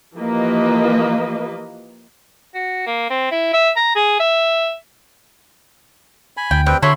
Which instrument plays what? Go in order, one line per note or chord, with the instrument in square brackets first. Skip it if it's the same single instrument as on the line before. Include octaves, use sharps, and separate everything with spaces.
[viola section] E3 F3 A#3 G4 B4 D#5
[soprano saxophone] F#4
A#3
C4
E4
E5
A#5
G#4
E5
[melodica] G#5 B5
[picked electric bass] D2 [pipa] G5
[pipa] G3 [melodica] C4 B4 G5
[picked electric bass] D3 [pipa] F#4 A4 C#5 [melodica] E5 B5 C6